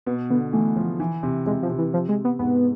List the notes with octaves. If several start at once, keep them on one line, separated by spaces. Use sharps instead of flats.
B2 B3
D3 B3
E3 A3
F3
E3
C3
C3 G#3
F3
C3
E3
F3
G#3
B3
G#2 B3